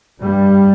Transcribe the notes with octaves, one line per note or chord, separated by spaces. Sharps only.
G2 G3